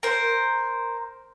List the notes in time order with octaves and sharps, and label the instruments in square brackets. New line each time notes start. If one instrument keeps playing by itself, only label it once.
[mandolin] A#4 C5